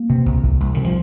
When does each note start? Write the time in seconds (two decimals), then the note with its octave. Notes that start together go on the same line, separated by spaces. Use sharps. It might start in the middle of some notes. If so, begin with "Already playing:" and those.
Already playing: A#3
0.10 C3
0.26 C2
0.43 C2
0.60 C2
0.74 C3 D#3
0.84 F3